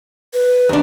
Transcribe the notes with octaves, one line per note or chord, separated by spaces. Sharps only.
B4
D#2 D4